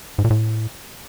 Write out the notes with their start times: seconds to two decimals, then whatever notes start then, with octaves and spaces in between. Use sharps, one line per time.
0.18 G#2
0.24 A#2
0.30 A2